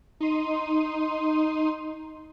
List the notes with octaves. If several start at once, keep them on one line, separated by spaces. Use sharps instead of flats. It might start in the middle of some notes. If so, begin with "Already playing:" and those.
D#4 C6 D#7